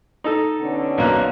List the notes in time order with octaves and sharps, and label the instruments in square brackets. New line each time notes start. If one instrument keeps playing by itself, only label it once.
[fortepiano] D#4 A4
[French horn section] B2 D3 C#4
[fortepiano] B1 A#3 F#6